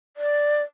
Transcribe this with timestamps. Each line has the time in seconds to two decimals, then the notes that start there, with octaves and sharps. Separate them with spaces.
0.17 D5